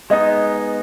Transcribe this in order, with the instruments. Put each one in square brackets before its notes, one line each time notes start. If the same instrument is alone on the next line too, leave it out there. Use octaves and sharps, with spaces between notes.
[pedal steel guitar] G#3 B3 D#4 [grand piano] D#5